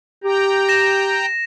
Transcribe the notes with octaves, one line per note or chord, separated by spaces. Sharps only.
G4 G5 A#5
A#6 E7